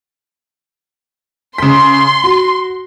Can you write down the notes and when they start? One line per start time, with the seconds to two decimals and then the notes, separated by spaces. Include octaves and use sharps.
1.58 C#3 C6 B6
2.24 F#4